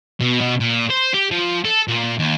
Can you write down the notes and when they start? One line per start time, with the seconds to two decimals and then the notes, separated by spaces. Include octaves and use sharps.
0.21 B2
0.41 B2
0.60 A#2
0.91 C5
1.14 G4
1.31 F3
1.65 A4
1.88 A#2
2.19 D#2